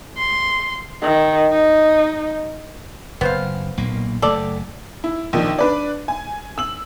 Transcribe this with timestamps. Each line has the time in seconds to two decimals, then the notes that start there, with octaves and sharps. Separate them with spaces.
0.17 C6
1.02 D#3
1.52 D#4
3.21 F#1 B3 C5 F5
3.77 B1 A#2 A#3
4.22 F#1 A3 A4 D5
5.04 E4
5.33 A#1 D#3 F3
5.59 D4 B4 D5
6.08 G#5
6.58 E6 F#7